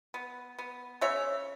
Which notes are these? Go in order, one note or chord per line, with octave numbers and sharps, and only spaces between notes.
B3
B3
C#3 C#5 E5